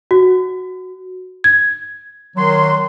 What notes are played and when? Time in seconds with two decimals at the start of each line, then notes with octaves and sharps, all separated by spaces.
0.11 F#4
1.44 G#6
2.36 D#3 F#3 C6